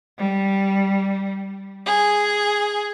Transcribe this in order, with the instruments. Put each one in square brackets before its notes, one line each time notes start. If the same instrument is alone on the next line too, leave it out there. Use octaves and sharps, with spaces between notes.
[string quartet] G3
G#4